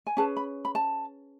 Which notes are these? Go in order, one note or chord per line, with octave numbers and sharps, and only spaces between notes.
G#5
C#4 G#4 B4 A5
B5
B5
A5